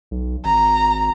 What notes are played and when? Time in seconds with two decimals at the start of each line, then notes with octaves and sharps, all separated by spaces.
0.11 B1
0.45 G#1 A#5